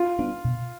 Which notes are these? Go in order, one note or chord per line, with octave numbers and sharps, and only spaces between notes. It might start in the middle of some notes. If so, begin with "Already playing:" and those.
Already playing: F4
G3 B3 D4
B2